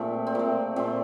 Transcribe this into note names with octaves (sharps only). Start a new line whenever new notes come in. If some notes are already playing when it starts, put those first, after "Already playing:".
Already playing: A#2 A3 C4
C4
A#2 A3 A#3
A#2 A3 C4